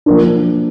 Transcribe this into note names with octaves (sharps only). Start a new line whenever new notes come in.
F3 A#3 D4